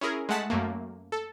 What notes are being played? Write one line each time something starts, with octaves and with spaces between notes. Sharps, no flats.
C#4 E4 G#4 A#4
G#3 A3 F#5 A5 B6
F#2 A3 A#3
A4